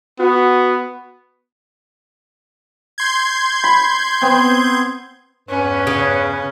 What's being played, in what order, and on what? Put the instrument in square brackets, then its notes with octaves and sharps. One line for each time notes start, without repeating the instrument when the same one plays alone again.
[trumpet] B3 [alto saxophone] F#4
[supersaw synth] C6 G6 G#6
[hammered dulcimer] B5
B3 C4
[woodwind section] E2 G2 B4 [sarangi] C#4
[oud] C#3